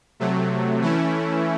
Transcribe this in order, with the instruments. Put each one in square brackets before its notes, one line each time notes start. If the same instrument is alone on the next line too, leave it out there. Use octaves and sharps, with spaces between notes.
[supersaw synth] C3 F#3 A3
E3 A3 C#4 E4